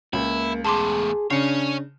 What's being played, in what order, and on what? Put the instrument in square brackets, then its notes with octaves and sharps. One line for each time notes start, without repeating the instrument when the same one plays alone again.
[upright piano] C#2 [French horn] A#3 [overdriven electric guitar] E4
[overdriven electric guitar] E2 A2 [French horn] G#4 [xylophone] A5 C6 D6
[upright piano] C#3 [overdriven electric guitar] C#4 C#5 [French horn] D4 [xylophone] C7 C#7